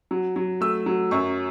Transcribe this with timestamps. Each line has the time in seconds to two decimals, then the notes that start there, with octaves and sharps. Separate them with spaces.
0.11 F#3
0.36 F#3
0.61 A3 E6
0.86 F#3
1.11 F#2 C#6